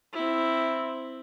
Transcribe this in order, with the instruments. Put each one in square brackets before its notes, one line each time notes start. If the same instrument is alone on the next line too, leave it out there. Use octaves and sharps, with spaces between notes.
[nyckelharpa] C4 E4